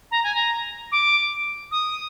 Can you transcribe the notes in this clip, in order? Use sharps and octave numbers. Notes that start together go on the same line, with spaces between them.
A#5
G#5
A#5
D6
D#6